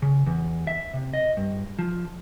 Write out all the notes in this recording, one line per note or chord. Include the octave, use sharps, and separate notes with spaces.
C#3
E2
E5
C3
D#5
G2
F3